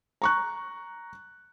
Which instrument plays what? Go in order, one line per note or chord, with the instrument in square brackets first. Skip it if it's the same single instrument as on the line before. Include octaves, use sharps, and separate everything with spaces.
[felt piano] A#5 C#6 F#6